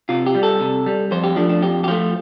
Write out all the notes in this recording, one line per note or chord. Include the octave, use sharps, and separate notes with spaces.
C3 F4
G4
G3
A4
C3
G3
F2 C5
G4
F3 A3 D4
D4
F2 G4
G4
F3 A3 F4